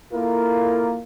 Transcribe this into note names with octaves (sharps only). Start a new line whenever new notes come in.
A#3 E4 F4 A4 A#4